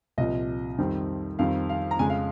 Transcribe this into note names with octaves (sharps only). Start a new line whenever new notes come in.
C2 A#2 F3 D#5
F2 D#3 G3 C4
F2 D#3 G3 C4 F5
F5
A#5
F2 C#3 G#3 G#5
F5